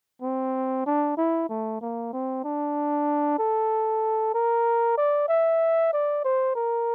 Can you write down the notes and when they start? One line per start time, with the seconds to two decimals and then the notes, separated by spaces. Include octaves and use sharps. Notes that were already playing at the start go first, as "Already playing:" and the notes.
0.22 C4
0.86 D4
1.17 E4
1.49 A3
1.81 A#3
2.13 C4
2.44 D4
3.39 A4
4.34 A#4
4.97 D5
5.28 E5
5.93 D5
6.24 C5
6.55 A#4